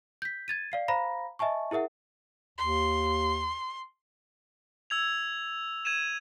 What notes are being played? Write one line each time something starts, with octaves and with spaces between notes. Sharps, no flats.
G6 B6
G#6 A6 D#7
D5 F5 C7
C5 F5 A#5 B5 A#6
D#5 E5 G#5 A5 C#6
E4 G#4 A#4 E5 F#5
D#2 C6
E6 G#6 F7
G#6 D#7 E7